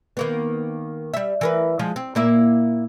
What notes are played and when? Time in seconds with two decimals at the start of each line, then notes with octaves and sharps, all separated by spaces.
0.17 D#3 A#3 B3
1.14 G3 E5
1.41 E3 A#4 B4
1.79 F3 G#3
1.96 C4
2.15 A#2 A#3 E4